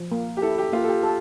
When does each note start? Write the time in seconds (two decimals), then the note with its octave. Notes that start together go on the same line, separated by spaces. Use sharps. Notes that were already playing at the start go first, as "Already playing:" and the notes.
Already playing: F3
0.12 A#3
0.37 G4
0.42 E4 A4
0.58 G4
0.73 A#3 F4
0.84 A4
0.88 G4
1.03 A4